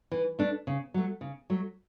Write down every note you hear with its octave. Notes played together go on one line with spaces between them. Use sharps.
E3
A3 D4
C#3
F#3 A3
C#3
F#3 A3